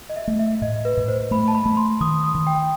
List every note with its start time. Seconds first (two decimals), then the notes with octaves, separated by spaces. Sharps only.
0.10 D#5
0.16 E5
0.28 A3
0.39 E5
0.62 A2 D#5
0.85 B4
0.97 A2
1.08 C5
1.31 A3 B5
1.48 A5
1.55 B5
1.66 A3
1.77 C6
2.01 D#3 D#6
2.24 D#6
2.35 D#3
2.47 G5